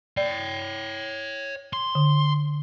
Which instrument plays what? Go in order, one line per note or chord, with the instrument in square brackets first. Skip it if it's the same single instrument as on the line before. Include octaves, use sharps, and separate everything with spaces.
[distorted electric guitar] C#5 G5 [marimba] D5
[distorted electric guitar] C6
[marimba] D3